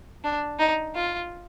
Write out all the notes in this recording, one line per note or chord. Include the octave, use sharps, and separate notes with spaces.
D4
D#4
F4